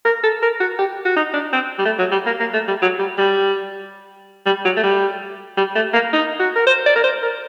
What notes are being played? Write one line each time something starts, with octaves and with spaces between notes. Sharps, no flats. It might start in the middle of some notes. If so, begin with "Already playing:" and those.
A#4
A4
A#4
F#4
G4
F#4
D#4
D4
C4
G3
A3
F#3
G3
A#3
A#3
A3
G3
F#3
G3
G3
G3
F#3
A3
G3
G3
A3
A#3
D#4
F#4
A#4
C5
D5
A#4
C5
A#4